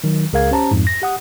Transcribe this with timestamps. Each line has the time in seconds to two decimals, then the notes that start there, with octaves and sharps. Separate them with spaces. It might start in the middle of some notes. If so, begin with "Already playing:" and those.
0.04 D#3 F#3
0.33 C#2 G#4 A#4 F5 G#6
0.51 C#4 G4 C5 A5 A#5
0.71 F2 G#2
0.87 A#6
1.02 G4 F#5 D#6